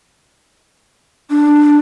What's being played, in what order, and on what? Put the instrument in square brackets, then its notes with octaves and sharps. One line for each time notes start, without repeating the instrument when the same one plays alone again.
[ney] D4